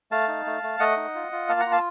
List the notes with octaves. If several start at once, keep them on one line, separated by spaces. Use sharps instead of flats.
A3 F5 A5
D#4
A3
A3
A3 D#5 F#5
D#4
F4
F4
A#3 F5 A5
F#5 A#5
F4
F5 A5